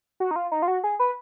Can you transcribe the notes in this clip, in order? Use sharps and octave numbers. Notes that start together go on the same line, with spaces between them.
F#4
D#4
F4
D#4
F4
F#4
G#4
B4